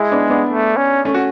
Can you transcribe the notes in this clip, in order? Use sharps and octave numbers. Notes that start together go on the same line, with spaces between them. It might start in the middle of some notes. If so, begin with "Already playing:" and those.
Already playing: G#3 E4 G#4
B3 D4
B3 D4
A3
C#4
A3 C#4
F#4